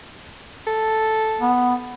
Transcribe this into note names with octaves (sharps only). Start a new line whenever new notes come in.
A4
B3